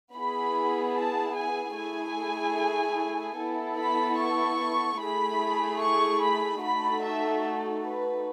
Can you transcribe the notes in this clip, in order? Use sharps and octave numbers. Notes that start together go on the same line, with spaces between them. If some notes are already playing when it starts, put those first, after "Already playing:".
B3 E4 G#4 B5
A5
G#5
A3 E4 G#4 G#5
B3 E4 A4
B5
C#6
A3 E4 G#4 B5
C#6
B5
A3 D#4 F#4 A4 B5
E5
B4